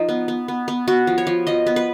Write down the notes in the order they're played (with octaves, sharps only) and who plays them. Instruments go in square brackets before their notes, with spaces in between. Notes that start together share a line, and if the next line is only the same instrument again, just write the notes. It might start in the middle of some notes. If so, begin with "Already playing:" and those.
Already playing: [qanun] F3 D#4
B3
B3
B3
B3
B3 F#4
F3
C#5
F3
F3 D#5
B3
B4